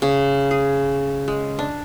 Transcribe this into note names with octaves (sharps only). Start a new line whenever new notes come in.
C#3
G#4
G#3
D4